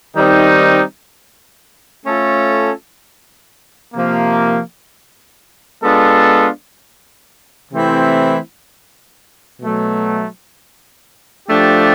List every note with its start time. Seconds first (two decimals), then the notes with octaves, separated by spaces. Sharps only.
0.16 D#3 G3 C4 D#4
2.05 A3 C#4 F4 A4
3.94 C3 F3 A#3
5.82 G#3 B3 D4 F4 A4
7.70 C3 E3 A3 C4 E4
9.60 B2 F#3 A3
11.48 F3 A3 D4 G4